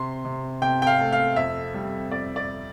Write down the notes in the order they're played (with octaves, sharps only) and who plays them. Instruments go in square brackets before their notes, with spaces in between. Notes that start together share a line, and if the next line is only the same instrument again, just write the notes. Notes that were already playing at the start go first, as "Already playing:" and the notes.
Already playing: [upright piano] C3 C6
C3
C3 G5
G5
F5
A3
F5
F2 E5
G3
F2 D5
D5